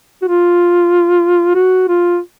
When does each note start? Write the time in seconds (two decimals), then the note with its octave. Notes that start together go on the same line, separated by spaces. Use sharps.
0.22 F#4
0.28 F4
1.55 F#4
1.88 F4